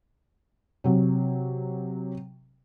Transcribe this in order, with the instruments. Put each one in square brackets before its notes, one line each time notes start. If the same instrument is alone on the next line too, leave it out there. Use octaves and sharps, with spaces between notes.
[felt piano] C3 F#3